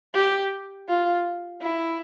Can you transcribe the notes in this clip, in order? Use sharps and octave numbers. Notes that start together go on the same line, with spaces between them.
G4
F4
E4